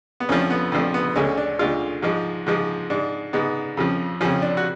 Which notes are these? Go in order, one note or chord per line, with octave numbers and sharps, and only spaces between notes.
B3
F2 D3 F3 A3 C#4
B3
F2 D3 F3 A3
B3
D2 D3 G#3 C#4
D4
D2 D3 G#3 F4
G#2 F3 G#3
G#2 F3 G#3
G#2 G#3 D4
G#2 G#3 B3
F2 C#3 F3
F2 C#3 F3 C#4
D4
F#4